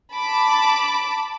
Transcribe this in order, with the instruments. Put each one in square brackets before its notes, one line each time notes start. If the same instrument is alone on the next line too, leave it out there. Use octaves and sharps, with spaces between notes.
[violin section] A5 B5 D6